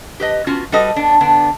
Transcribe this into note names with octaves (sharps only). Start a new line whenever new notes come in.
G4 B4 D#5
B3 C#4 F4 F#4
G3 F#4 A4 B4 D#5
B3 D4
D3 B3 D4